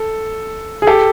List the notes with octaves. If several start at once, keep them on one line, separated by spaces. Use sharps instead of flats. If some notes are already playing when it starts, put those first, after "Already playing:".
Already playing: A4
G#4
G4 A4